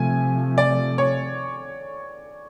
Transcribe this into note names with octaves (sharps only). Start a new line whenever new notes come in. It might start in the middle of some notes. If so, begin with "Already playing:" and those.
Already playing: C3 F3 A3 G#5
D5
C#5